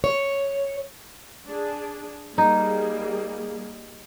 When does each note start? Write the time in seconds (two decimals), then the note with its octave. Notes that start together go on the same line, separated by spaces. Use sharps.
0.04 C#5
1.47 D4 G#4
2.38 G3 A#3 D#4 G#4